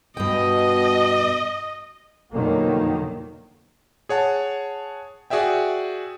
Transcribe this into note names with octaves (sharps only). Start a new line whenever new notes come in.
G2 B2 D#5 G5
F2 B2 D3 D#3 F#3 A#3
G#4 C#5 F#5 A5
F#4 G#4 D5 E5 G5